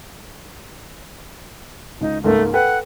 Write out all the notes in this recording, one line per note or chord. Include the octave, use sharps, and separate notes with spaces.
C#2 D#4
C#2 G#2 A3 A#3
A4 B4 F#5 G5